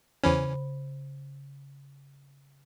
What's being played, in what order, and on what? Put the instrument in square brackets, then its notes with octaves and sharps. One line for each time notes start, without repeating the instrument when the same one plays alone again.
[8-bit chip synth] E2 E3 C#4 [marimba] C#3 C5 B5